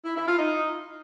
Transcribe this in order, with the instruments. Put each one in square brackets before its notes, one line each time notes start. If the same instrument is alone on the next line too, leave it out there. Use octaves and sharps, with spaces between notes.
[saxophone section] E4
E4
F4
D#4